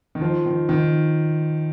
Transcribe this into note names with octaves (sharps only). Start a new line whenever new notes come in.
D#3
F3
D#3
D#3